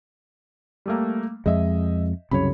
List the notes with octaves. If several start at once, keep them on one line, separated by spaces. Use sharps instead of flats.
G3 A3 A#3
F2 G#3 D#5 E5
C2 F#2 C#3 C#5 B5